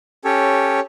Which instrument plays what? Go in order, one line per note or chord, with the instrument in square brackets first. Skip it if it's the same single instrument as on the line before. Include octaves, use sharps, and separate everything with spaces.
[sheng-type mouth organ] C#4 G4 A4 C#5